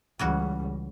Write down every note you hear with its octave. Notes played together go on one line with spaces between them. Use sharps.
C#2 C#3 E3 G3 F#4